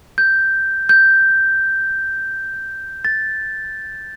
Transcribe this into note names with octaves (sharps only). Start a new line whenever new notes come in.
G6
G6
A6